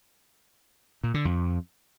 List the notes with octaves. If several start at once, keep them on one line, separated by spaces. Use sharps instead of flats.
A#2
D3
F2